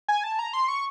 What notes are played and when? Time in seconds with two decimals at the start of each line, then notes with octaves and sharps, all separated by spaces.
0.08 G#5
0.24 A5
0.39 A#5
0.54 C6
0.68 C#6